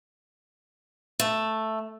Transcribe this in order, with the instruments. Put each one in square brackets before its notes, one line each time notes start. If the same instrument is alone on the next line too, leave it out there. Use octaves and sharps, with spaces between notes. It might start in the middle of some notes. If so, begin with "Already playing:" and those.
[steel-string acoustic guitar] A3